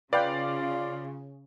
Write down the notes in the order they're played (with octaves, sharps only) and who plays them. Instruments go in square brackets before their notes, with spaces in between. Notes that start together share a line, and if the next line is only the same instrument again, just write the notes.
[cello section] C#3 [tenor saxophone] F4 [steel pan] B4 G5 [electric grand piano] D5 F5